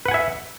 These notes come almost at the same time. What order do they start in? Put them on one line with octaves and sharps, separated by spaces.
B4 F#5 G#5 E5